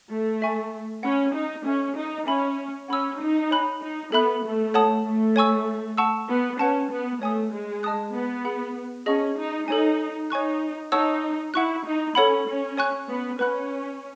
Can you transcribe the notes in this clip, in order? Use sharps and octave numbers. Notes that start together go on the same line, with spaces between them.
A3
A4 E5 G#5 C#6
C#4 F#5 B5 F#6
D#4
C#4 A4 C#5 E5 G#5
D#4
C#4 E5 G#5 B5
C#4 F#5 B5 E6
D#4
C#5 G#5 B5 F#6
D#4
B3 A4 E5 B5 F#6
A3
A4 C#5 F#5 A5 D#6
A3
C#5 G#5 C#6 E6
F#5 A5 C#6 E6
B3
C#4 B4 F#5 A5
B3
A3 C#5 G#5 D#6
G#3
D#5 A5 D#6 F#6
B3
G#4 B4 F#5 B5
C#4 G#4 D#5 F#5 A5 C#6
D#4
D#4 A4 C#5 G#5
D#4 C#5 G#5 C#6 F#6
D#4 C#5 F#5 A5 C#6 E6
E4 F#5 C#6 F#6
D#4
C#4 A4 C#5 F#5 B5
C#4
C#5 G#5 C#6 F#6
B3
C#4 B4 F#5 B5 F#6